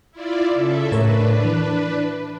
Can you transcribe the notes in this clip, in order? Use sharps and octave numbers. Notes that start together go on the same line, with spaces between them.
E4 F4 D5
C#3 A4 E5
A2 D4 A#4 B4 C#5
E3